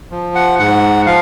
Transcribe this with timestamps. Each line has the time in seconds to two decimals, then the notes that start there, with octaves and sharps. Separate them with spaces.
0.11 F3
0.35 F#5
0.59 G#2 F#5
1.06 F3 F5